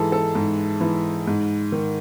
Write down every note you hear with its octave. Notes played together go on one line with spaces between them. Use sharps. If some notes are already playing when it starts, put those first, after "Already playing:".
Already playing: G#2 E3 G#4 A4
A4
G#2
E3
G#2
D#3